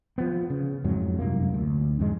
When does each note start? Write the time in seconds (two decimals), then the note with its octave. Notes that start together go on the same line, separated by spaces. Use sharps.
0.18 F3 B3
0.50 C#3
0.84 F2 G#2 F#3
1.19 F1 C2 F#2 A#3
1.54 D2
1.99 F2 G#2 G#3